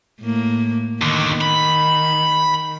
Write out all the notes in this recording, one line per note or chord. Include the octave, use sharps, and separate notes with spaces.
A2 A#3
D#2 D3 D#3
B5